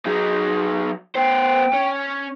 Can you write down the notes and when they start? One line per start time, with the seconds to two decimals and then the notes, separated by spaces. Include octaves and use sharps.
0.06 F#3 D#4 G#4
1.16 B3 C5 G5
1.73 C#4